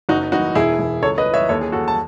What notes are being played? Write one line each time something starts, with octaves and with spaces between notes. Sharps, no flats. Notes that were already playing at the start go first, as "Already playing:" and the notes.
F#1 D#4 F#4
E3 D#4 F#4
E1 E4 G#4
E1
C#2 A4 C#5
B4 D#5
E3
C#5 E5
D#2 A4 C#5
G#4
D#2 F#4 A4
A5